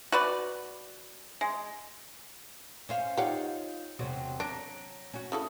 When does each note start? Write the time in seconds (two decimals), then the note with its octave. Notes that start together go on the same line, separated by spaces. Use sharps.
0.12 F#4 B4 D5
1.41 G#3
2.89 C#4 C5 F5
3.17 D#4 F4 G4 C#5 F5 F#5
3.99 E1 C3 F#3 F#4
4.40 F#3 D4 A#5 A#6 D7
5.14 C#4 F#4
5.32 C#3 E4 A4 D#6